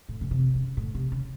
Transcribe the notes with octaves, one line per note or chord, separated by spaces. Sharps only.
A2
C#3
C3
C#3
A2
C3
C#3